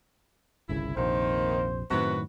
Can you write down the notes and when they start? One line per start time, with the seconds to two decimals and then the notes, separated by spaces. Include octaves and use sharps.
0.69 G1 C2 C#3 E4
0.97 A#1 F2 C3 D#3 A#3 C5
1.91 F#2 A2 C3 D#3 F#4 B4